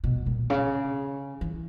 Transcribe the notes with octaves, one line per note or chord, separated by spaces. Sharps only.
B2
A#2
C#3
E3